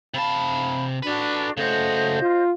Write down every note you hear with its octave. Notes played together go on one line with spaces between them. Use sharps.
C3 F5 A5 B5
D4 F#4 A4 B4
C#3 A3 F#4 C5 D#5 G6
F4